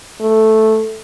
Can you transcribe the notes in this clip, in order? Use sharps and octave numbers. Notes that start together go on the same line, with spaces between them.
A3